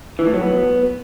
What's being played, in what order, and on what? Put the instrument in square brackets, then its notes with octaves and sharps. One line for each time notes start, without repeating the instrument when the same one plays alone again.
[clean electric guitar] E3
A2
F#3
B3